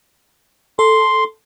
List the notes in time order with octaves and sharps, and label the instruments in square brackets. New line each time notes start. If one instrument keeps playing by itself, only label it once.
[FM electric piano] A4 [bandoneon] C6